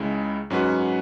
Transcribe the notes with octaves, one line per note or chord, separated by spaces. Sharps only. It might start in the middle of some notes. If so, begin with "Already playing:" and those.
Already playing: C#2 C#3 G#3 E4
G#2 F#3 C#4 F#4 B4